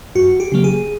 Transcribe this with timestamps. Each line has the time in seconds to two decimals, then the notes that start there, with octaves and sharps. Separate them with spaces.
0.15 F#2 F#4
0.40 G4
0.52 C#3 F#3 A#3
0.64 G#4